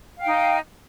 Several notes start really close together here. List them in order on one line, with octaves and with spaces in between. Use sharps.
F5 G5 D#4